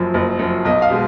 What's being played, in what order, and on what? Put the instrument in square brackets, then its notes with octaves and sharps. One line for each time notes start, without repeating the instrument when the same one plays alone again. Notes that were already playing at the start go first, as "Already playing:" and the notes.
Already playing: [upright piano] F#1 F#2 F3
F#1
F#2 F3
B1 D#5
F5
B2 G#3